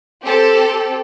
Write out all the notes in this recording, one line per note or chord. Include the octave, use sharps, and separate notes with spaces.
C4 G4 A4